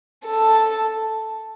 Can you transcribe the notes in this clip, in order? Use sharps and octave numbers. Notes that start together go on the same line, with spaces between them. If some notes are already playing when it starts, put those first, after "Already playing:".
A4